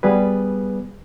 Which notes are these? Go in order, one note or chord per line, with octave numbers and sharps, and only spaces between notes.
G3 B3 G#4 B4